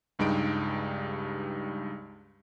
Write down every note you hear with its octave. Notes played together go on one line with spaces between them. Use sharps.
C#2 G2 G3 G#3 D#4 D7